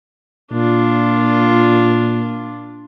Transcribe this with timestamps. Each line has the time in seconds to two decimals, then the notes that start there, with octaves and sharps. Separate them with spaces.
0.52 A#2 D4 F4